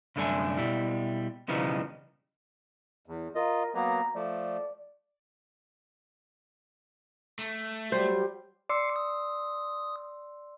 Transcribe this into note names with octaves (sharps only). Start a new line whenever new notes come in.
C2 F#2 D3 A3 D4 G#5
B2 G3 E4
B1 C#3 E3 F3 G3 D#4
E2
F4 A#4 D#5
F#3 A#3 B3 A#5
F3 A3 D5
A3
F#3 G3 C5
D5 C6 D6 E6 C7 C#7
D#6